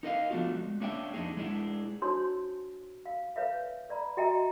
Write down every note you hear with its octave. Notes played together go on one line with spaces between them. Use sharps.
D#4 A#4 D#5 F5
F3 A3 B3 D4 F4 F#4
G#3
A#3 C#4 D4 E5 G5
F2 D4 D#4 G#4
G#3 A3 D4 E4 G#4
D4 D#4 F#4 C5 C#5 C6
F5
B4 C#5 E5 F5
B4 D5 A#5 B5
F#4 D#5 E5 G5 G#5 A#5